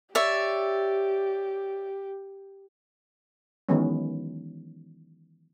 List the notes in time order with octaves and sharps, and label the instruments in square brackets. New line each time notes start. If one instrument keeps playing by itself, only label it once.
[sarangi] G4 [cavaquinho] C#5 D5 E5
[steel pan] D#3 E3 F#3 G#3 B3 C#4